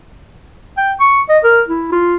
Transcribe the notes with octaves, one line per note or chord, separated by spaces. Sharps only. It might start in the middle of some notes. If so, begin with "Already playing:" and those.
G5
C#6
D#5
A#4
E4
F4